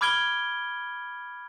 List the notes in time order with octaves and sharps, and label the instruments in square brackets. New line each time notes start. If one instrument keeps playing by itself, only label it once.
[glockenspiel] B5 D6 F6 G#6 D7 G7